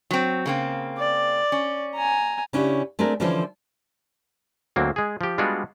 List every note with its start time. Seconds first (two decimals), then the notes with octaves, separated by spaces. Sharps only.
0.11 F#3 C4
0.46 C#3 A#3 C4
0.98 D5
1.52 C#4
1.95 G#5 A#5
2.53 C#3 C#4 D4 E4 G4
2.99 A3 C4 D4 G#4 A#4
3.20 D3 E3 F3 C#4 A4 C5
4.76 D2 F#3 A#3 C4
4.96 G#3 G#4
5.21 F3 G4
5.38 G3 G#3 B3 D4 F4 F#4